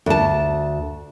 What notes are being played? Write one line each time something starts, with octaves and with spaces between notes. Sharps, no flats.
D2 A5